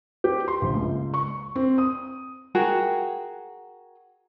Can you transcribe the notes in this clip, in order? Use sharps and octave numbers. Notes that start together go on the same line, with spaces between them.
G4
C6
A#1
C#2
C#6
C4
D#6
F#4 G#4 A#4 G5